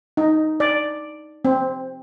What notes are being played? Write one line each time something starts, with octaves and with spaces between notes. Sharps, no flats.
D#4
D5
C4